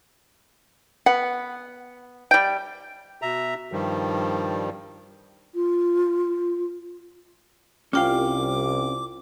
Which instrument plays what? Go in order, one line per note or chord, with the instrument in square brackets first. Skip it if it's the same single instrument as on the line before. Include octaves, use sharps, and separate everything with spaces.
[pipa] B3 [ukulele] F#5
[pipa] G3 G5
[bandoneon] B2 E5 A#5
G2 D#3 F3 G3
[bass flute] F4
[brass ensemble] C2 [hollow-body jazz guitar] C#4 A#4 F5 [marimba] F4 G5 [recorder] D6